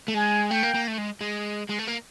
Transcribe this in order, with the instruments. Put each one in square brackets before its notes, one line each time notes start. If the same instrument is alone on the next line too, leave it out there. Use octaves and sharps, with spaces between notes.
[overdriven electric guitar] A3
[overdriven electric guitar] G#3 [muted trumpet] G#5
[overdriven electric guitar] A3 [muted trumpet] G5
[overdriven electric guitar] A#3
A#3
A3
G#3
G#3
G#3
A3
A#3